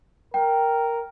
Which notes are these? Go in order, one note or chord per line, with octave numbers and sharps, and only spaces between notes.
A#4 G5